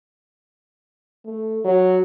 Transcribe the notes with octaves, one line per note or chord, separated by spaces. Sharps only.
A3
F#3